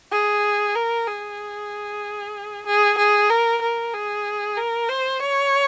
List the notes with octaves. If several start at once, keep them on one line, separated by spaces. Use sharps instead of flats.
G#4
A#4
G#4
G#4
G#4
A#4
A#4
G#4
A#4
C5
C#5